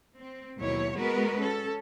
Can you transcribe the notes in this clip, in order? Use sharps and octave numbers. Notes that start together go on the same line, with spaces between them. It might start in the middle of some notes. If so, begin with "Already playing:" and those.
C4
D#2 B2 F#3 E4 C#5
G#3 B3 F#4 A#4 B4
C#4 A4